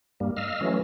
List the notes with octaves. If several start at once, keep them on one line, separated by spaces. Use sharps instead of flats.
G2 G3 A#3
D#5 F5 E6 F6
E3 F#3 A3 C#4